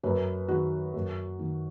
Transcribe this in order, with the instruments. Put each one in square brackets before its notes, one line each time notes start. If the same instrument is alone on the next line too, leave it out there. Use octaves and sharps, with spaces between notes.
[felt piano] F#2 B4
D#3 F#4
F#2
D#3